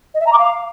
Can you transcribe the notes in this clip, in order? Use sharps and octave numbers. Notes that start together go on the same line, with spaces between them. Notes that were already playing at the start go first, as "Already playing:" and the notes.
D#5
E5
A#5
D6
F5